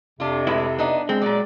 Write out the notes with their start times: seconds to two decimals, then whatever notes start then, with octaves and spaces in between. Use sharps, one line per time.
0.20 F2 C3 D4 F4
0.47 A2 G#3 E4 B4
0.78 B3 D4 D#4
1.09 G#3 C4
1.22 A#2 F#3 D5